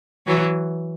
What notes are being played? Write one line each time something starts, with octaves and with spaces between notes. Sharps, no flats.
E3 F#3